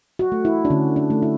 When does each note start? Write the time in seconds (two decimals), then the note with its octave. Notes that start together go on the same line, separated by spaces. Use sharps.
0.19 F#4
0.32 A3
0.45 E4
0.65 D4
0.70 D3 C#4
0.96 D4
1.10 A3
1.22 E4